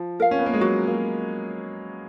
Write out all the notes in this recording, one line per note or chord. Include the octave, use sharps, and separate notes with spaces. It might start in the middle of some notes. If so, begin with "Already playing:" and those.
Already playing: F3
A#4 F5
C#4
B3
A#3
G#3
F#3 F#4
A#3